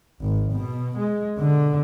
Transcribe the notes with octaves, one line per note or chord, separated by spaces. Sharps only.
G#1
B2
G#3
B2 D3